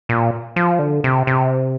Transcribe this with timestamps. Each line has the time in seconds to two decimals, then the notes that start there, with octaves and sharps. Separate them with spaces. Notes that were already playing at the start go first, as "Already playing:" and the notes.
0.09 A#2
0.56 F3
0.79 D3
1.04 C3
1.27 C3